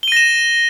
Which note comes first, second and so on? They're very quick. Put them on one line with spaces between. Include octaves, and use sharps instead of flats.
G7 D#7 A#6 E7